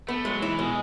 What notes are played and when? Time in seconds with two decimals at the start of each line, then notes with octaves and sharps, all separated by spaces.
0.08 A3 B3
0.25 F#3 G#3
0.42 E3 E4
0.59 B2 G#3